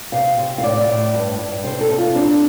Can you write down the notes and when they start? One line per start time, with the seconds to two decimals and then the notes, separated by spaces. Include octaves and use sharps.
0.12 C3 F5
0.37 C3
0.58 F5
0.63 A2 D5
0.88 A2
1.14 G2
1.39 G2
1.64 C3 C5
1.81 A4
1.90 C3
1.98 F4
2.15 C4 D4